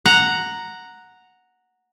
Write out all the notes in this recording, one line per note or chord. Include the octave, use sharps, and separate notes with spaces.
F#5 A#5